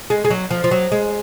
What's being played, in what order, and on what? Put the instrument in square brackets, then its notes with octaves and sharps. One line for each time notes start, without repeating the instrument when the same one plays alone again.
[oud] G#3
G#3
F#3
F3
F3
F#3
G#3